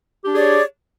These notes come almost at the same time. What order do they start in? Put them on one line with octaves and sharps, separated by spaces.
G4 D4 G#4 D5 C#5